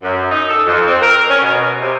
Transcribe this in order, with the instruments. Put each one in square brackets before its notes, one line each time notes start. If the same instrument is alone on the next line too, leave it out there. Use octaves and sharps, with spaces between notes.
[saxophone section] F#2
D#4
A4
F2
C4
A#4
C#4
B2
C3